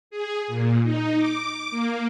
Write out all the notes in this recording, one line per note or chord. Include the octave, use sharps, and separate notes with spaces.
G#4
A#2
D#4
D6
A#3